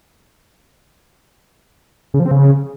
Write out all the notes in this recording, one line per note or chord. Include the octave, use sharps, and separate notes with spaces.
C#3
F3
C4
C#3